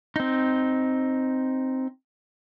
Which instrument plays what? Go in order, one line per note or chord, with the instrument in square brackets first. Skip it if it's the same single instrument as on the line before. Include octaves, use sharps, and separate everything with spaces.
[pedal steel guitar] C4 D#4